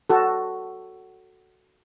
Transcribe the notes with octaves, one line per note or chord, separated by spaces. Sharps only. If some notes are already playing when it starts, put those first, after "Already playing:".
F#4 A4